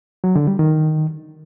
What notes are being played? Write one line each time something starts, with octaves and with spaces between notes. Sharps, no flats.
F#3
D3
G3
D#3